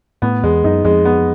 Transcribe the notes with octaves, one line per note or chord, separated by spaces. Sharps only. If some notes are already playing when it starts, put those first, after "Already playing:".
A2 B3
E2 G#3
F#2 D#4
F2 G#3
B3